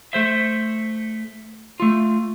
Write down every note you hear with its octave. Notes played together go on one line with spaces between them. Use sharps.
A3 C5 E5
A3 F4